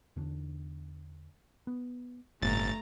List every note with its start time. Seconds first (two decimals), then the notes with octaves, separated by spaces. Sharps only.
0.16 E2 D3 D4
1.67 B3
2.42 G1 A2 A3 C4 A#5 A6